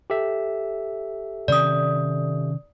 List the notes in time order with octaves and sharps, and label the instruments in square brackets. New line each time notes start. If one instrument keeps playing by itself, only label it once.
[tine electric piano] G4 A4 E5
[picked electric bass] C3 D#3 C#4 [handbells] D5 D#6